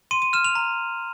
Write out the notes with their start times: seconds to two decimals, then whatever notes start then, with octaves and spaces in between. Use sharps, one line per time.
0.11 C6 D#7
0.22 D#7
0.33 F6 E7
0.44 F7
0.55 A#5